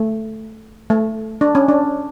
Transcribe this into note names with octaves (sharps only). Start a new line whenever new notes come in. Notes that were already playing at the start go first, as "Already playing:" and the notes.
Already playing: A3
A3
D4
C#4
D4